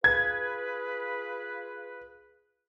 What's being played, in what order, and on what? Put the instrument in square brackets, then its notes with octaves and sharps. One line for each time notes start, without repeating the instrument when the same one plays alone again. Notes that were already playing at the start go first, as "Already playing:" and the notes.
[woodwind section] F4 G#4 B4 [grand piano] G#6